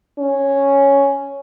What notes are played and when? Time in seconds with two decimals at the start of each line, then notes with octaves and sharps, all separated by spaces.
0.19 C#4